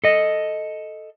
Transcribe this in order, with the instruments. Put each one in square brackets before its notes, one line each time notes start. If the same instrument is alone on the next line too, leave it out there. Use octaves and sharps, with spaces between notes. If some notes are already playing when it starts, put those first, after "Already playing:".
[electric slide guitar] A4 D#5